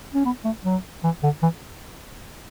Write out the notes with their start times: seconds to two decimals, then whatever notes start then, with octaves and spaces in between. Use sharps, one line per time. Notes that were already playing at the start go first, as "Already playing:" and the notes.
0.14 C#4
0.26 B3
0.45 A3
0.65 F#3
1.04 E3
1.24 D3
1.43 E3